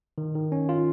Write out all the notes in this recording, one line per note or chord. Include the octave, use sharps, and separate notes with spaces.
D#3
D#3
C#4
F4